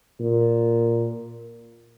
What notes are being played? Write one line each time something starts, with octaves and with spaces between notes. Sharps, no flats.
A#2